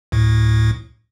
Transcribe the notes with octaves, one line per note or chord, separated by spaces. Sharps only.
D2 A2